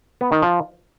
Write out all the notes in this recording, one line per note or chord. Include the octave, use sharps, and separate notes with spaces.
B3
D#3
F3